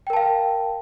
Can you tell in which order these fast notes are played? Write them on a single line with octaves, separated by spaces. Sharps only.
G5 A#4 A5 F5